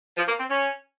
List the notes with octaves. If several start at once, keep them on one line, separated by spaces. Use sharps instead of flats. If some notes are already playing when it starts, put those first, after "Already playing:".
F3
A#3
C4
C#4